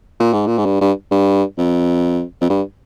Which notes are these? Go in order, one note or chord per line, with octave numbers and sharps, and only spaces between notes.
A#2
G#2
A#2
G#2
G2
G2
G2
F2
F2
G2